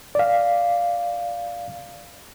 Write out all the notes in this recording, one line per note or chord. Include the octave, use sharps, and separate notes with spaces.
D5 F5